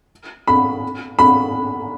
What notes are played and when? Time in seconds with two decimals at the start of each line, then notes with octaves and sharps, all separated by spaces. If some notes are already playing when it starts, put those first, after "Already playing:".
0.47 B5
1.19 B5